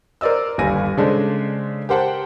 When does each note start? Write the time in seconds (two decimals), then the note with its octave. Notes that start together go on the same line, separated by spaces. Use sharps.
0.21 A#4 C5 D5 D#5 E6
0.58 G1 D#2 G3 G#5 A#6 D#7
0.97 C#3 G#3 D4 A4 C5
1.89 G4 A#4 C5 F#5 G5 A5